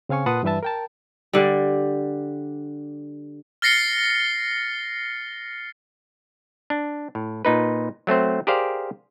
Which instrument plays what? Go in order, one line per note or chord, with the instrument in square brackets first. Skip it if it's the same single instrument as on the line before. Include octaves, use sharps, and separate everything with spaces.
[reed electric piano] C#3 C4 F5 G#5 C#6
A#2 B4 F#5 A5 C6 D#6
G2 E3 G3 B4 E5 A5
A#4 G5 A5
[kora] D3 G3
[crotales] F6 A6 A#6 C7 C#7 G7
[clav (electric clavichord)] D4
A2
A#2 D#4 B4
F#3 A3 C4 C5
G4 G#4 A#4 C5 D5 F5